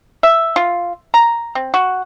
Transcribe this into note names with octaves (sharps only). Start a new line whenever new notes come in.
E5
F4
A#5
C4
F#4